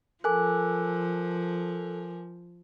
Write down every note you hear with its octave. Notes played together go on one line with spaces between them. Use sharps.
F3 A4 A#4 G#5 D6 F#6